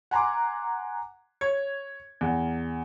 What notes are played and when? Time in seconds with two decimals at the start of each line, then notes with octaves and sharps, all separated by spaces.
0.11 F#5 G#5 A#5 C6 D6
1.41 C#5 G#6
2.21 E2